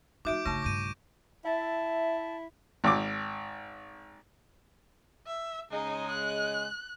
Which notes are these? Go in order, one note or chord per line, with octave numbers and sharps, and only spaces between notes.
F3 A3 D#4 F#4 E5 D6 G6 D7
G1 C#3 A3 D4 C#6 A#6
B1 G2 D6 G6 D#7
E4 E5 A5
G#1 D6
E5
C#3 G#3 D#4
F#6